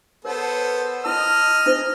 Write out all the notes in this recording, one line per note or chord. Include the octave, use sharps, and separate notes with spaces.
B3 A4 A#4 C5 C#5
E4 D#5 A5 E6 F6
D4 E4 C5